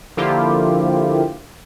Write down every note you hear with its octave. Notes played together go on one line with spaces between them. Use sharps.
D3 F3 A#3 E4 F4 G4